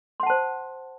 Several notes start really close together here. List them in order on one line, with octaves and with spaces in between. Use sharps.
C6 F#5 A5 C5